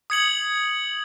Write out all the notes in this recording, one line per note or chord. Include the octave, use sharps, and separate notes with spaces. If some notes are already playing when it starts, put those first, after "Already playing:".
D#6 G#6 C#7 F#7